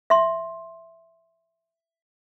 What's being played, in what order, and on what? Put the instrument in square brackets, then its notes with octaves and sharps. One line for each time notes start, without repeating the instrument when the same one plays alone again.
[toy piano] E5 C6